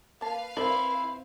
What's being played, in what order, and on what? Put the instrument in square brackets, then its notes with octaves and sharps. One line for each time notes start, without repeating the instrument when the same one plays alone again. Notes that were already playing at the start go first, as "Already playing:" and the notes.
[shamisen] A#3 A5 [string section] B4 F5
[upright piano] C4 [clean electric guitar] E4 [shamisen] A#4 D5